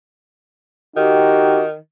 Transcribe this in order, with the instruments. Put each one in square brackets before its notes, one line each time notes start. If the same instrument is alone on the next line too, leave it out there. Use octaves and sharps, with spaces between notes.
[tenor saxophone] D#3 [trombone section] D#4 F#4 G4